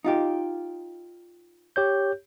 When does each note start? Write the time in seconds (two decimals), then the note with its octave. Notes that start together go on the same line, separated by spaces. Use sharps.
0.04 D#4 F4 G4
1.76 G4 C#5 G6